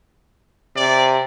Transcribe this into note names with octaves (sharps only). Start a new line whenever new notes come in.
C3 D5